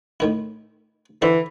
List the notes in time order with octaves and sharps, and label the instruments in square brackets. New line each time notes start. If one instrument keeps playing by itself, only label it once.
[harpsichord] A2 D#3 E4
[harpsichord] D3 E4 C5 [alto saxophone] E3